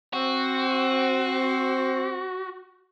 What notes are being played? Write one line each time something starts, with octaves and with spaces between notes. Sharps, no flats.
C4 F#4